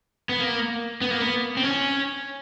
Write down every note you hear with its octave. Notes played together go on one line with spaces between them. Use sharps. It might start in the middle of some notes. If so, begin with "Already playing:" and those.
B3
A#3
B3
A#3
B3
C4
C#4